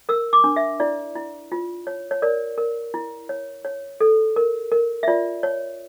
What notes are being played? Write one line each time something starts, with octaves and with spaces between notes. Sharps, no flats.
A#4 E6
D6
D4
E5
E4 D5
E4
F4
C#5
C#5
A#4 D5
A#4
E4
C#5
C#5
A4
A#4
A#4
E5
F4 D5
C#5